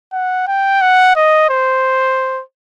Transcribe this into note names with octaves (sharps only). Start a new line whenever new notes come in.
F#5
G5
F#5
D#5
C5